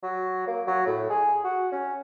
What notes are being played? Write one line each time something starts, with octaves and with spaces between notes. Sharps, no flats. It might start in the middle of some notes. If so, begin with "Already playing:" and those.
F#3
A#3
F#3
A2
G#4
F#4
C#4